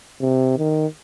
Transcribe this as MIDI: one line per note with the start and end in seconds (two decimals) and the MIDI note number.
0.21 0.54 48
0.58 0.87 51